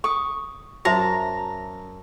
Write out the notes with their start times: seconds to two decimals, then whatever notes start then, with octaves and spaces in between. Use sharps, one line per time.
0.04 A4 C#6 D#6
0.85 F#2 F#4 C5 E5 A5 A#5